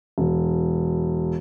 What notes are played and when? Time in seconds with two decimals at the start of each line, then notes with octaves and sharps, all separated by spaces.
0.18 E1